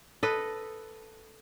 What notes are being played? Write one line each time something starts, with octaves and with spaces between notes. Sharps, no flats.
A4 B4 D#5